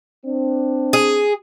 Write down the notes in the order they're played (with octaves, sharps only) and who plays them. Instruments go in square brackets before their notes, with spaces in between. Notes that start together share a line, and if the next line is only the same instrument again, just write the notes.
[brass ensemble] C4 D4
[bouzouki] G#4